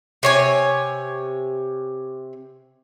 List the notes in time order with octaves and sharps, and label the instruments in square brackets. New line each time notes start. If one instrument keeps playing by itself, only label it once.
[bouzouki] C3 C#5 G#5